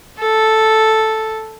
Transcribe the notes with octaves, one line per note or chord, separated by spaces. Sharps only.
A4